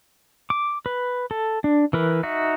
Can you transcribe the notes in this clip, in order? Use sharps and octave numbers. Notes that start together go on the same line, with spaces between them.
D6
B4
A4
D4
E3 A#4 B4
D#4 F#4 E5